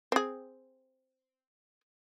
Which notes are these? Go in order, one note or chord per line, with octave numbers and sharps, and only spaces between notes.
C4 G#4